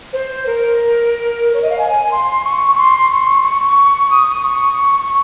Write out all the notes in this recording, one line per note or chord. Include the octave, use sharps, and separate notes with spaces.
C5
A#4
C#5
D#5
F5
G#5
C6
C#6
C#6
C6
C#6
C#6
D#6
C#6
C#6